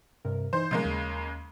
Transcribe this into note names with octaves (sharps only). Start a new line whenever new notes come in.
G2 C3 A#4
E3 D#4 C5 G6
C#3 F3 G3 G#3 A#3 C#4
D#2